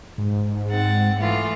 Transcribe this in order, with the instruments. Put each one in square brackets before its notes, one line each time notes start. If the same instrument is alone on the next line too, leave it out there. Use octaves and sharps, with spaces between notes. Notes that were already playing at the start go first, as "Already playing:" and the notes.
[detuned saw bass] G#2
[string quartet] C4 F#5 A6
A2 E3 F4